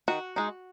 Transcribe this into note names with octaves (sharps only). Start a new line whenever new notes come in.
D#3 F#4
G#3 D#4